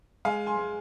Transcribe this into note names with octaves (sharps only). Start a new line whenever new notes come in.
G#3 F5 G#5
G#5 C6
G#3